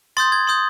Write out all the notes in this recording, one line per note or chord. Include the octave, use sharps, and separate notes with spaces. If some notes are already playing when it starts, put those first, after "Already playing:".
C6 D#6 G6 A6
G#6
C6 D#6 G6